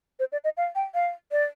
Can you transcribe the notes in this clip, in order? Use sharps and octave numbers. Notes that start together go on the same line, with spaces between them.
C5
D5
D#5
F5
G5
F5
D5